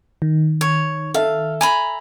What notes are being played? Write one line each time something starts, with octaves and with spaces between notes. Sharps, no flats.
D#3
C#5
A4 E5 F5
G#5 A#5 B5